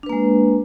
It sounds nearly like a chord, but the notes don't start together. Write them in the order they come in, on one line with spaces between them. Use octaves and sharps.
D4 B4 A#3 G#3